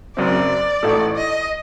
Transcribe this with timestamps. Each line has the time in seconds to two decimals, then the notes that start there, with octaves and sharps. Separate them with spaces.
0.17 F#1 F#2 F#3 C4 D5
0.83 A1 A2 A3 D#4 A4
1.16 D#5